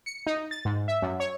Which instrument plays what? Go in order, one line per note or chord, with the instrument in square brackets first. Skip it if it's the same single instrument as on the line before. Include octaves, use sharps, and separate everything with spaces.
[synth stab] C#7
D#4
A6
G#2
E5
F#2
C#5